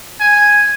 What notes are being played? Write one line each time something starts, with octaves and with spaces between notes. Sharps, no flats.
G#5